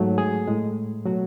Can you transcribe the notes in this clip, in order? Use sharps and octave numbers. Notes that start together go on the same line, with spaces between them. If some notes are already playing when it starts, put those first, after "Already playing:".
Already playing: G#2 F#3 A3
G#4
A2 G#3
B2 F#3 A3 F#4